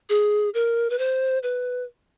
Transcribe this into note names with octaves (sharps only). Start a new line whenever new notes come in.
G#4
A#4
B4
C5
B4